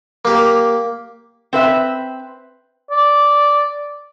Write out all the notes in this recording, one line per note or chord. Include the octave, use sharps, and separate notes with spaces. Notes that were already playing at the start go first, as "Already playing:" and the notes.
A#3 G4
C4 B4 E5
D5